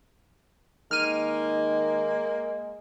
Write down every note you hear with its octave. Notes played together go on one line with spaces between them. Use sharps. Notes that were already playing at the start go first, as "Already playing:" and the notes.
D#3 G#3 A#3 F6 D#7